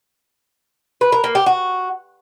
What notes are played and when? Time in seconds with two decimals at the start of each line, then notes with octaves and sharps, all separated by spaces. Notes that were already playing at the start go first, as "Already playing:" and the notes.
1.01 B4
1.12 A#4
1.24 A#3
1.35 G4
1.46 F#4